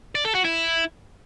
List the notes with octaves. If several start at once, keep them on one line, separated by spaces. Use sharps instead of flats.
D5
A4
F#4
E4